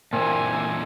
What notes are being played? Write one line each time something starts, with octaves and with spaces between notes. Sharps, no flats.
A#2 D3 E3 A#3 C4 G#5